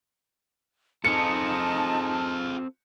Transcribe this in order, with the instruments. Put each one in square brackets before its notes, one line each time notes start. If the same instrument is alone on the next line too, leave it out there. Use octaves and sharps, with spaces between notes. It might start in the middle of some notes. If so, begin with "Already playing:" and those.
[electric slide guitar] C4 A4 [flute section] D#4 A5 [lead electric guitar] F4 G#4 [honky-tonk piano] C#7